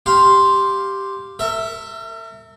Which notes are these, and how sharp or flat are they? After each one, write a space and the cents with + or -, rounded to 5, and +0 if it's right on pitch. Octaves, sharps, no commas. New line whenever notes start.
G4 +0 F5 +0 C6 +0
A#4 -45 E5 +0